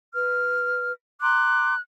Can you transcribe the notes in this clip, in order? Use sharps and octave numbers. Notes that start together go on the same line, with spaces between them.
B4 F6
A#5 C6 D6 F#6